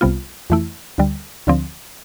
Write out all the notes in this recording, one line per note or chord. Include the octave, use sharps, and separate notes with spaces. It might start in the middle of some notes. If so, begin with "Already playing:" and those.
C2 C3 G3 B3 F4
F2 E3 A3 E4
D2 D3 G3
D2 D3 F3 C4